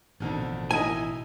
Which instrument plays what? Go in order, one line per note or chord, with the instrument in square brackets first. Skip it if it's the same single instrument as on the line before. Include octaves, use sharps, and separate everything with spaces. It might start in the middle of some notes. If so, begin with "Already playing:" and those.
[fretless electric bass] A1 B2 [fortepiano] F2 D3 D#3
[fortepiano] D#4 E4 D#5 [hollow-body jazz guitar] G#5